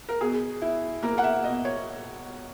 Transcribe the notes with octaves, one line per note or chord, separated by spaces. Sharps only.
A#4
B2 G#4
E4
A#3 A#4
F#5
E5
B2 D#5
C#5